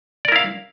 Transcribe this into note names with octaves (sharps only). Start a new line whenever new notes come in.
E4 A#4 D5 F5